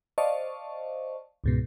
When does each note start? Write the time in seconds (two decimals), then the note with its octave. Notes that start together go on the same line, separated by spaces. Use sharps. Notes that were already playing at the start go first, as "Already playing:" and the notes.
0.18 C5 D5 D#5 F5 A5 C#6
1.44 C#2 G#2 B2